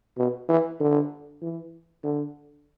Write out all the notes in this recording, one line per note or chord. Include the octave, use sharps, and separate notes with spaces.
B2
E3
D3
E3
D3